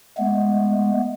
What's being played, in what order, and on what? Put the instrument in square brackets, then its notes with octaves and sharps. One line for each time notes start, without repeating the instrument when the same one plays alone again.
[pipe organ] G#3 A3 B3